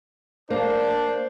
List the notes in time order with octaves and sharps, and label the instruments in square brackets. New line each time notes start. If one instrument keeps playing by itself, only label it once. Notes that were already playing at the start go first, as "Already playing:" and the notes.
[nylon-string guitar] A#3 [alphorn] D4 [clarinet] C5